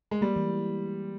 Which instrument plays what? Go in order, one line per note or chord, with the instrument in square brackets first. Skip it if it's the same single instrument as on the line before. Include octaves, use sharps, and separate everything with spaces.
[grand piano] G#3
[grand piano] G3 [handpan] A#3
[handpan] E3